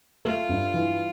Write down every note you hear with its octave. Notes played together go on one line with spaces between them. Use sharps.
A3 F4
G2
E3